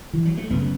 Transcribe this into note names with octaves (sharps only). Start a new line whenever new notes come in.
E3
F#3
A3
F#2 C#3 B3